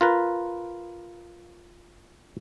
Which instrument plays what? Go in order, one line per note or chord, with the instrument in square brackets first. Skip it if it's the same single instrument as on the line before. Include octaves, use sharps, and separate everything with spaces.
[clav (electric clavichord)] F4 A#4 B4